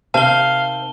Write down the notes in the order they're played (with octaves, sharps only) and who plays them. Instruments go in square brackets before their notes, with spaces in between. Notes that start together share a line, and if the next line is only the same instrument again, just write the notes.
[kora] C3 D#3 [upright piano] C4 [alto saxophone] F5 [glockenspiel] A5 G7